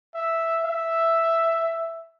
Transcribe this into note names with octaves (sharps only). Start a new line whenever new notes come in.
E5
E5